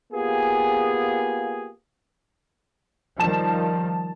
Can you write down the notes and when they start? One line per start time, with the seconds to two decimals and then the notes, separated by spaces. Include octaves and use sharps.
0.13 A#3 B3 F4 G4 G#4
3.20 D#3 F3 G3 A5 E7